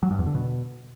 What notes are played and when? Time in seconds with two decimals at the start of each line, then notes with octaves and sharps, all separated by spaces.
0.03 F#3
0.11 G2
0.19 E2
0.27 D3
0.35 B2